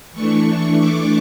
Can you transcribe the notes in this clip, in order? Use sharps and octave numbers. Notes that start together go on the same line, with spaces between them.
E3 A3 D4 C#6
D6